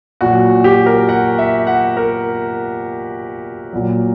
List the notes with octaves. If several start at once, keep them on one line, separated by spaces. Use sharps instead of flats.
A#2 F#3 F#4
G4
A#4
F#5
E5
F#5
A#4
A#2 F#3